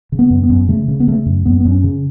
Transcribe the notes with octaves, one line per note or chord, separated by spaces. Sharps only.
C#3
B3
F#2
B3
F#2
C#3 A3
C#3
B3
C#3 A3
F#2
F#2 B3
F#2 B3
C#4
C#3